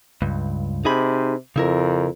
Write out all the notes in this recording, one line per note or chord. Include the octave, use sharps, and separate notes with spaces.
C#2 G2
C3 D#4 G#4 B5
F2 C#3 E4 A#4